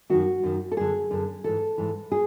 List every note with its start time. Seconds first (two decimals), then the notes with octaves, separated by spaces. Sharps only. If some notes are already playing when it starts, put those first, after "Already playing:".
0.10 F#2 D#3 F#4
0.43 F#2 D#3
0.72 A4
0.77 F#2 D3 G#4
1.11 F#2 D3
1.44 G#2 E3 A4
1.78 G#2 E3
2.12 G#4